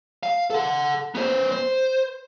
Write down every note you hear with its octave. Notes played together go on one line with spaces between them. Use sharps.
F5
A4 F#5
B3 C5
C5